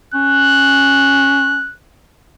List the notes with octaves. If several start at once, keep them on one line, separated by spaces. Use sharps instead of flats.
C#4 F#6